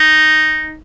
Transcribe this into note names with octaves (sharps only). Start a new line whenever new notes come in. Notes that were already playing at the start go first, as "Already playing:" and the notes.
Already playing: D#4